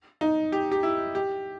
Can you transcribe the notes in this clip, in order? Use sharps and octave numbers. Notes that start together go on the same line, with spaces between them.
D#4
G4
G4
E4
G4